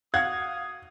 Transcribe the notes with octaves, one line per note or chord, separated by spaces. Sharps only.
F#4 F5 F#5 D#6 G#6